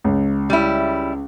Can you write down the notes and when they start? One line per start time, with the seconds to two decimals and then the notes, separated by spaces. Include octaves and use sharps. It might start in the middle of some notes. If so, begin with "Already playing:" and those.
0.04 C#2
0.50 G3 E4